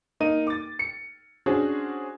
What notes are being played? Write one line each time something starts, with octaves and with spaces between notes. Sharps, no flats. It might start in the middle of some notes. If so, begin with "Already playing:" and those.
A#3 D#4 D#7
D6 A6
C#7
C#4 D4 F#4 G#4 C5